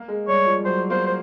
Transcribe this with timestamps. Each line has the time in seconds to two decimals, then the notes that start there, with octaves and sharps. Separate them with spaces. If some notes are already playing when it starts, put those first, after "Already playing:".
Already playing: A#3
0.08 G#3
0.28 G3 C#5
0.46 F3
0.65 F#3 C5
0.90 A#3 C5
1.06 C5